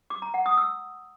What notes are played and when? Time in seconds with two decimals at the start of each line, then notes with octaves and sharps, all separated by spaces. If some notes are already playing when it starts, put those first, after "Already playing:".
0.10 D6
0.22 A#5
0.34 F#5
0.46 D#6
0.57 E6